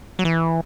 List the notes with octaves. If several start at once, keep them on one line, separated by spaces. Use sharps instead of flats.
F#3
E3